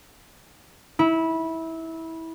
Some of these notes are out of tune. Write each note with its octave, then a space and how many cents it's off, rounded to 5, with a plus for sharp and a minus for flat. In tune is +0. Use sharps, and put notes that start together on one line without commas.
E4 -20